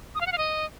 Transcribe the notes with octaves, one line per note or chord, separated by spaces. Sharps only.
D#6
F5
F#5
F5
D#5